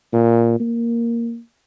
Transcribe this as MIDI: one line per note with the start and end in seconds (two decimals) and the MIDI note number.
0.13 0.56 46
0.60 1.39 58